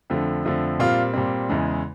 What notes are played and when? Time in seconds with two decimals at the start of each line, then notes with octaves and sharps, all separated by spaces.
0.10 F2 D3 F3 A3
0.45 F2 D3 F3 A3
0.79 A#2 G3 C4 F4
1.14 A#2 G3 C4
1.49 E2 C#3 E3 G#3